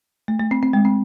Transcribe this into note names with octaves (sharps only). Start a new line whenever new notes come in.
A3
A3
C4
C4
G#3
C4